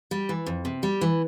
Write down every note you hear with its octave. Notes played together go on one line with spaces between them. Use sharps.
G3
E3
F2
C3
G3
E3